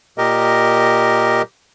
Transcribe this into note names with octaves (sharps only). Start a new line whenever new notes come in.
A#2 G4 A#4 D#5